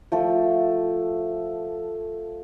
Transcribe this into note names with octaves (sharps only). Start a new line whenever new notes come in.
F3 A3 A4